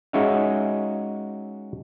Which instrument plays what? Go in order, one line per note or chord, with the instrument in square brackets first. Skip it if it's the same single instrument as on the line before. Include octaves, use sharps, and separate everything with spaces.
[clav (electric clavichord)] G#3 C#4 D#4 F#4 E5 F5